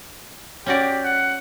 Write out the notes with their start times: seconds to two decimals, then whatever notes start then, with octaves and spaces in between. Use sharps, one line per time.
0.66 C#4 F#4 G4 D5
1.04 F#5